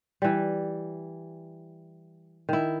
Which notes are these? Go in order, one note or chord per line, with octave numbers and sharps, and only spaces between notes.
E3 G3
D#3 E4